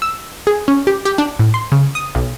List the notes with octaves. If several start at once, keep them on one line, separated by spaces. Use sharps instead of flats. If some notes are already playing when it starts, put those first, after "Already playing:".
E6
G#4
C#4
G4
G4
D4
A2
C6
C#3
D#6
B1